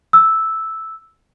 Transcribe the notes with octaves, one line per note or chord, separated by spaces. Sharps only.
E6